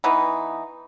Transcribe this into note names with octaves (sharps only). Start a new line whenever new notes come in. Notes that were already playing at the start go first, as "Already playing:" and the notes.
E3 B3 D#4